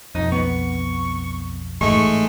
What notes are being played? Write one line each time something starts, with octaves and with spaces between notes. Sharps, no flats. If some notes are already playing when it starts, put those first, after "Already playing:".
B1 F2 D#4
B3 C#6
A1 G#2 G#3 A3 C#6